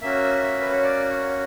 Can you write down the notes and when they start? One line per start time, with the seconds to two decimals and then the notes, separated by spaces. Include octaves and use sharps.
0.01 A#3 C#4 F#4 E5
0.42 E5
0.61 B4
0.72 C#5
0.83 D5
1.09 C#5